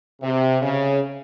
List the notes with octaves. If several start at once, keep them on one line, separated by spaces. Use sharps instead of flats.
C3
C#3